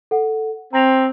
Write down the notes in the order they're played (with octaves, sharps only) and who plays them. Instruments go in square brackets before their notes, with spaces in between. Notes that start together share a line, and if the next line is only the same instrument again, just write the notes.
[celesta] A4 F#5
[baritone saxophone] C4 [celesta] A#5 A#6 F7